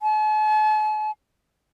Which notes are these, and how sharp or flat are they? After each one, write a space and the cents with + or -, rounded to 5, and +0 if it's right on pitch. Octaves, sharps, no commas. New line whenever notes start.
A5 -45